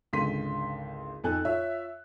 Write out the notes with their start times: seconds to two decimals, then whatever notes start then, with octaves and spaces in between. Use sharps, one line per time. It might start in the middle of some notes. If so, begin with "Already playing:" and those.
0.13 G#1 C#2 D3 C6 B6 D#7
1.24 F2 D#4 A4 G#5 F#6
1.45 F4 C#5 E5